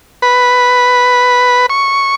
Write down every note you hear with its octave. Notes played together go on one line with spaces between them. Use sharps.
B4
C#6